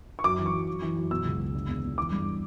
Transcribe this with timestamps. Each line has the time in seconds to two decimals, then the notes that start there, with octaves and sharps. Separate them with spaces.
0.19 C#6
0.24 F#2 D6
0.39 E3
0.46 C#6
0.54 F#2
0.68 F#2
0.82 E3
0.96 F#2
1.11 B2 E6
1.25 C#2
1.40 C#2
1.54 D3
1.68 E2
1.83 E2
1.98 E3 D6
2.12 G2